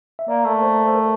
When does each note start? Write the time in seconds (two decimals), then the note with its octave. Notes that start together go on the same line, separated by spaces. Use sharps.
0.19 E5
0.28 A#3 D5
0.45 A3
0.58 A#4
0.62 C5
0.85 C5
0.95 A#4